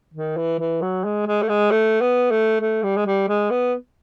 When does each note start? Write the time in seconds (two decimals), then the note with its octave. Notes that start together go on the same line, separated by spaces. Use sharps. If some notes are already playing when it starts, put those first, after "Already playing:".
0.14 D#3
0.37 E3
0.59 E3
0.82 F#3
1.04 G#3
1.26 G#3
1.43 A3
1.49 G#3
1.71 A3
2.01 B3
2.31 A3
2.61 A3
2.83 G3
2.96 G#3
3.06 G3
3.28 G#3
3.51 B3